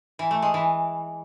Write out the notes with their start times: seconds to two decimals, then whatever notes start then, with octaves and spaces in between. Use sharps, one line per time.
0.19 E3
0.31 A3
0.42 G#3
0.54 E3